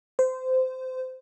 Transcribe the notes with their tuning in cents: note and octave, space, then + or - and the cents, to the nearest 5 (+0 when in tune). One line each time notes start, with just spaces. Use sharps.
C5 -20